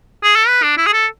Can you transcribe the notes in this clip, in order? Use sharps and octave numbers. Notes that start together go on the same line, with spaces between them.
G#4
A4
B4
D4
E4
G#4
A4